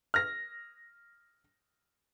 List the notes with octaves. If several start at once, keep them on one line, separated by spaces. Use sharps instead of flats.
F6 A#6